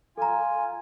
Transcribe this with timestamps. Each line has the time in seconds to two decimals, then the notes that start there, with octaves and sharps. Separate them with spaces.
0.18 F4 A4 G#5 A#5